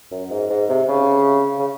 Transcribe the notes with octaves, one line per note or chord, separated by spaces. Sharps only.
F#2
G#2
G#2
C3
C#3
C#3